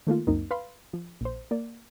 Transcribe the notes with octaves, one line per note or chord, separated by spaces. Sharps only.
D#3 A3 A#3 F4
C#2 F#2 A#3 C4 D#4
B4 F5 B5 C6
F3
A#1 C5
A#3 D5